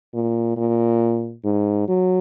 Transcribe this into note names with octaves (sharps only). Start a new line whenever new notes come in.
A#2
A#2
G#2
F#3